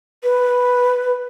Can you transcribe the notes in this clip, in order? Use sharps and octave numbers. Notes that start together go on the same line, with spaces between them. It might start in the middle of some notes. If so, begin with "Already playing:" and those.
B4